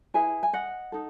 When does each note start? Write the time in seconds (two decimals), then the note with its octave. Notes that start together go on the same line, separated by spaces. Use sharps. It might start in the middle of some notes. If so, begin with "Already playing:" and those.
0.14 E4 G#4 B4 E5 G#5
0.43 G#5
0.53 D#5 F#5
0.92 D#4 A4